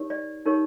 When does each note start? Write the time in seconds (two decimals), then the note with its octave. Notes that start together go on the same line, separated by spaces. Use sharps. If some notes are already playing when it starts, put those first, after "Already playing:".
Already playing: D#4 G4 A#4 C#5
0.10 D5
0.46 D#4 G4 A#4 C#5